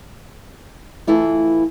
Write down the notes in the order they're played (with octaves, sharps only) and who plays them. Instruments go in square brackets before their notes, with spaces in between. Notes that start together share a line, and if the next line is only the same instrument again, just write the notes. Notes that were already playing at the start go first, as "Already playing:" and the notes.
[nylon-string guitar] E3 A3 E4 F4